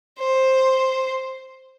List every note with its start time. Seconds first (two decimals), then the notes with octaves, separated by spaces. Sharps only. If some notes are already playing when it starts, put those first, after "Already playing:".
0.19 C5